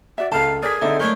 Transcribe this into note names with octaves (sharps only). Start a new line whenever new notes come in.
F#4 D5 E5
C#2 A4 F5 A5 A#5
G#4 A#4 D5 D#6 G#6 B6
D3 C4 D#4 E4 A4 D5 E5
G#3 A3 D4 A#4 C#5 G6